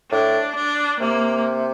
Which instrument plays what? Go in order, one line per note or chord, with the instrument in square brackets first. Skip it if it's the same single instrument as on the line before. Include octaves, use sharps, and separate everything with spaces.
[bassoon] A2 [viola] D4
[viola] D4
[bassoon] C3 [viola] A#3